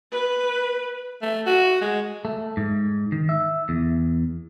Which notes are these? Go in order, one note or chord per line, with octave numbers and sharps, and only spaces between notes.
B4
A3
F#4
G#3
A3
G#2
D#3
E5
E2